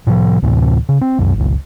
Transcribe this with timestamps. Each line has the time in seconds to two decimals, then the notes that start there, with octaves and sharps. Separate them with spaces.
0.07 A2 C3 E3 F3
0.42 D2 A2 C3 E3
0.89 C#3
1.01 C4
1.19 C2 F#2
1.34 G1 C#2